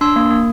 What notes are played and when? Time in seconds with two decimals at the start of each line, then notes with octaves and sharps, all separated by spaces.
0.01 D4 C6 E6
0.16 A#3
0.31 A#3